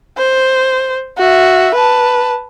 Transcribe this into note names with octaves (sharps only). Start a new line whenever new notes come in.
C5
F#4 E5
B4 A5